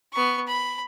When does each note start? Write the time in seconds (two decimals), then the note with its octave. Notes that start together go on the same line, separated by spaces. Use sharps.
0.13 B3 C#6
0.47 B5